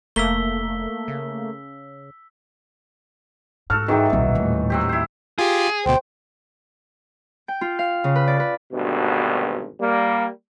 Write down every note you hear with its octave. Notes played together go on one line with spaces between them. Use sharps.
F1 A3 A#3 E6 B6 G7
C#3
G#2 F#4 A4 F6
D#3 E3 F#3 D#4 G#4 G5
D#1 B1
D#2 A2
F#3 C4 G4
E4 C5
F4 G4 G#4
D2 B2 C5 G5
G5
F4
F5
C#3
B4
D5
B4
G#1 D2 G2 B2
G3 A#3